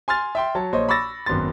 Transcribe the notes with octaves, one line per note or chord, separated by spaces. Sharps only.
G#5 C6 F6 A6
E5 G5 C6
F#3 C#5 A5
A#1 C5 C#5 D#5
B5 C#6 D6 E6 A6 A#6
G#1 F#2 B3 C6 A6